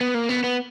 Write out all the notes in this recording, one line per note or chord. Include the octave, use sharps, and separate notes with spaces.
B3
A#3
B3
B3